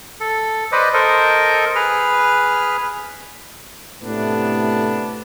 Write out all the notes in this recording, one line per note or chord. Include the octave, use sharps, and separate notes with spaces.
A4
B4 C5 D5 D#5
A4 A#4 C5 D#5
G#4 B4 F6
A2 C3 A3 B3 D4